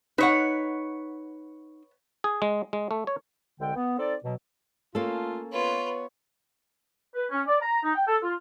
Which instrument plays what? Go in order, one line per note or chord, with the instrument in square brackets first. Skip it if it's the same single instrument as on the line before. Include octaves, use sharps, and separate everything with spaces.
[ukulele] D#4 [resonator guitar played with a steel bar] B4 C#5 F#5
[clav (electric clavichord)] G#4
G#3
G#3
A3
C#5
[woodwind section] C2 D3 G#3 G5
B3
C4 D#4 A4 D5
B2 F#3
[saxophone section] A3 F4 [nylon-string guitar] A#3 C#4 A4
[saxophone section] B3 C#5 [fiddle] F4 B4
[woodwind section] B4
C#4
D5
A#5
D#4
G5
A4
F4